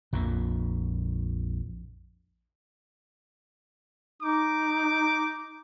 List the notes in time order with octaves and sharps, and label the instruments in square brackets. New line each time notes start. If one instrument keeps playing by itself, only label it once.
[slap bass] A#1 F2 A#2
[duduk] D#4 [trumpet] D6